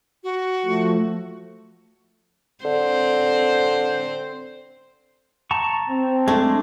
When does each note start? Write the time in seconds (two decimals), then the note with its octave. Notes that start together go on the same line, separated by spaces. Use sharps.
0.24 F#4
0.65 F3 A3
2.64 D3 C4 C5
5.51 A5 A#5 C#6
5.89 C4
6.28 G#3 A3 D4